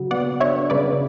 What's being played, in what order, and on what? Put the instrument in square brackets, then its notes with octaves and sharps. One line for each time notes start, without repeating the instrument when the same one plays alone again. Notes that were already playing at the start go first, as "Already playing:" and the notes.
Already playing: [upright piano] C#3 F#3
[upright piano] B3 [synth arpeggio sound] D5 F#5
[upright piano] D4 [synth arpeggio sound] C#5 E5
[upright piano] C#3 [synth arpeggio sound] B4 D5